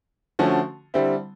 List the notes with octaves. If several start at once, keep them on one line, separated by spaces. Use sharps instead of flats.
D3 F3 A3 C#4 F#4
D3 G3 C4 E4